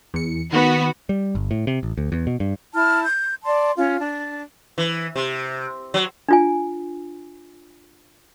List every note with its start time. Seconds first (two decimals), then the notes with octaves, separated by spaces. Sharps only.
0.14 E2 C#7
0.53 D#3 B3 F#4
1.09 G3
1.35 G1
1.51 A2
1.67 C3
1.83 A1
1.98 D2
2.12 E2
2.27 B2
2.40 G2
2.74 E4 A5 F6
3.04 G6
3.44 D5 A5 C6
3.76 C#4 F4
3.98 D4
4.78 E3
5.16 C3
5.94 F#3
6.29 D4 F4 G#5